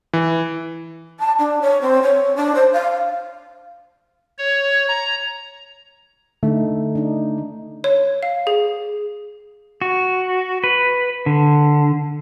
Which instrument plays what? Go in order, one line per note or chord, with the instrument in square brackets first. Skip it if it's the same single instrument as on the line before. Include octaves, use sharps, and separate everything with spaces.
[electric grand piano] E3
[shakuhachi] A5
D4
C#5
C4
C#5
D4
C5
F5
[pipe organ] C#5
A#5
[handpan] D3 D#4 [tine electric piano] A3
[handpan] D4 D#4
[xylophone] C#5
F5
G#4
[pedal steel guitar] F#4
B4
D3